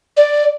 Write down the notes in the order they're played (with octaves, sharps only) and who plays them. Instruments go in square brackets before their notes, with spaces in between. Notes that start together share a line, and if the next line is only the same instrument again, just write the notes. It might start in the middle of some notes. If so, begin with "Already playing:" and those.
[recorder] D5